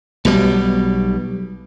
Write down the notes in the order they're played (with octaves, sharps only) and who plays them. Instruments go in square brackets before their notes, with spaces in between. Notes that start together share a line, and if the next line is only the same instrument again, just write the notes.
[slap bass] B1 B2 G3